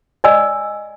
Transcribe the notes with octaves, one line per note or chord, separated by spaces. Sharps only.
D5 D#5 G#5 E6